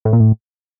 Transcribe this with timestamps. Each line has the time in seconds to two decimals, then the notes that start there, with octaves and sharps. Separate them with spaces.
0.05 A2
0.13 A#2
0.20 A2